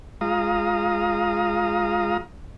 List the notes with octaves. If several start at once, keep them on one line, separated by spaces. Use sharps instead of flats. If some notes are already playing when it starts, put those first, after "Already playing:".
G#3 F4 F5 A#5 D#6